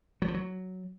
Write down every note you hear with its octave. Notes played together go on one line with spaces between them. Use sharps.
F#3
F3
F#3